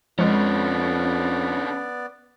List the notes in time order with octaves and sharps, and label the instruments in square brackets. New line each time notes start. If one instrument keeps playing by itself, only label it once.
[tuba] F2 [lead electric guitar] D3 C#4 [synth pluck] F3 G#3 [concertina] B3 D5